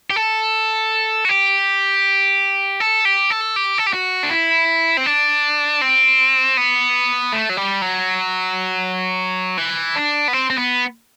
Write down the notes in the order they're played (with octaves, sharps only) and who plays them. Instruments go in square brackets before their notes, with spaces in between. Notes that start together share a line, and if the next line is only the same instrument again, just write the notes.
[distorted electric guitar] G4
A4
F#4
G4
A4
G4
A4
G4
A4
G4
F#4
D4
E4
C4
D4
C4
B3
A3
F#3
G3
F#3
E3
D4
B3
C4
C4
B3